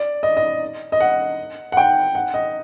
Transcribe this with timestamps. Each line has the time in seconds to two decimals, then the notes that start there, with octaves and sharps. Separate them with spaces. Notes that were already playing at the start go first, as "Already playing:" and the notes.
Already playing: D5
0.23 D#5
0.37 D#5
0.92 D#5
1.00 F#5
1.72 F#5
1.77 G5
2.15 F#5
2.34 D#5